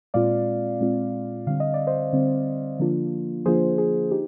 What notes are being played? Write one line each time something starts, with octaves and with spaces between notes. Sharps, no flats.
A#2 G#3 C4 F4 D5 F5
A#2 G#3 C4 F4
D3 G3 C4 F5
D#5
D5
C5 D#5
D3 G3 C4
D3 F3 A#3 D4 F4
D3 F3 A#3 D4 F4 G#4 C5
G#4
D#4 G4